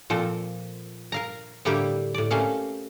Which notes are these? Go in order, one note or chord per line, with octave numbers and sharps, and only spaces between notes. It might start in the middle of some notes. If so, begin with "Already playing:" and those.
A#2 F3 C4 A4
A#4 F5 A#5
A2 D3 G3 A#3 E4 G4
A2 D5
C3 A3 A#3 C#4 F5